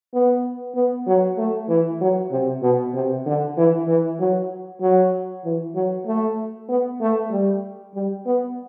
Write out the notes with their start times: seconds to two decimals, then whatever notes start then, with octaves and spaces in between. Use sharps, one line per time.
0.13 B3
0.75 B3
1.07 F#3
1.38 A3
1.69 E3
2.01 F#3
2.31 C3
2.62 B2
2.94 C3
3.26 D3
3.57 E3
3.88 E3
4.19 F#3
4.81 F#3
5.45 E3
5.75 F#3
6.06 A3
6.69 B3
7.01 A3
7.31 G3
7.95 G3
8.26 B3